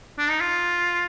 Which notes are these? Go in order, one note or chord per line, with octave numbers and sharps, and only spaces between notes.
D4
D#4
F4